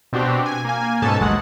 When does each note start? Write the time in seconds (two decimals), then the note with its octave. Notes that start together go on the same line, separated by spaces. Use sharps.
0.13 B2 C4 D4 F#4 G4
0.46 G#5
0.65 A#3 G#5
1.02 G#2 B2 C#4 A4 A5
1.20 A1 D#2 F#3 G#3 F#5